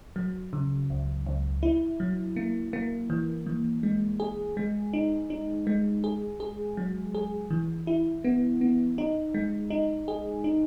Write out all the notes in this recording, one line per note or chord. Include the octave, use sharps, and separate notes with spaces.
F#3
C#3
C#2
C#2
E4
F#3
A#3
A#3
E3
E3
G#3
G#4
G#3
D#4
D#4
G#3
G#4
G#4
F#3
G#4
E3
E4
B3
B3
D#4
G#3
D#4
G#4
D#4